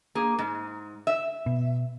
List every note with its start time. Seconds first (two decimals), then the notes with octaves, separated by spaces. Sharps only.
0.15 A#3 G#4
0.39 G#2
1.07 E5
1.46 B2